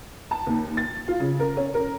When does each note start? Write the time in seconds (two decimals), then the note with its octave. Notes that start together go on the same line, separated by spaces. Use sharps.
0.31 A5
0.47 D#2
0.77 A6
1.08 F4
1.20 C#3
1.40 A#4
1.57 C#4
1.74 A#4